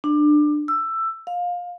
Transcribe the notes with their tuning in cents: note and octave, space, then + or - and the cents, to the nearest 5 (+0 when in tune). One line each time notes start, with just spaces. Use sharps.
D4 +20
E6 +10
F5 +20